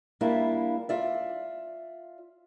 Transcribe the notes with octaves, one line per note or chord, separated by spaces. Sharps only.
G3 A#3 D4 E4 F4
F4 D5 E5